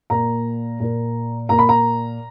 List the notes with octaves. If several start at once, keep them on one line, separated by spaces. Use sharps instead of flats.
A#2 A#3 A#5
A#2 A#3
A#2 A#3 A#5
B5
A#5